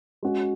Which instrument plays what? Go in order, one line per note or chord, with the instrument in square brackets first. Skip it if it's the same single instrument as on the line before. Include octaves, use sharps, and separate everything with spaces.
[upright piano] G#3 C#4 F#4